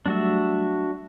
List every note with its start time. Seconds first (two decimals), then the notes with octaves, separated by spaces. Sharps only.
0.06 F#3 G3 A3 D4 F#4 E5